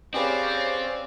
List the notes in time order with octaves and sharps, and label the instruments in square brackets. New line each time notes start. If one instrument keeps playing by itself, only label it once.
[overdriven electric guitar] C4 [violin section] C#4 F5 [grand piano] G4 G#4 B4 [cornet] D5